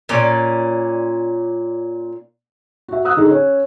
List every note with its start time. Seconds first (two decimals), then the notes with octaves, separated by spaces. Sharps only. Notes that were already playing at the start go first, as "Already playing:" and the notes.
0.09 A#2 C#4 D5
2.88 F#4 E5
3.05 D#6 E6 F#6
3.17 D3 D#4 G#4
3.31 C#4